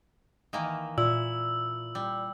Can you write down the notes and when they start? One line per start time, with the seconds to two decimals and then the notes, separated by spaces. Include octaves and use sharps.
0.53 D#3 E3 A#3
0.98 A#2 E4 E6
1.95 G3